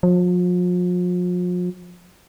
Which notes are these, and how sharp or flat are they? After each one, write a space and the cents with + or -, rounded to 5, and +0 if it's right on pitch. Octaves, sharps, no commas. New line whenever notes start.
F3 +40